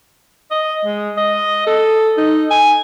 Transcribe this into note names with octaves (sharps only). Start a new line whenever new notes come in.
D#5
G#3
D#5
A4
D#4
G#5